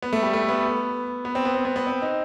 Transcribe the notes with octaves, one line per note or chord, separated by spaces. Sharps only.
B3
A3
G3
A3
B3
B3
C4
B3
C4
B3
B3
C4
D#4